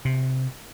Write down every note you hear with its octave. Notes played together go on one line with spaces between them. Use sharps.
C3